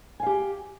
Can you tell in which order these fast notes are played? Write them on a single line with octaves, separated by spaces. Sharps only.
G#5 F5 G4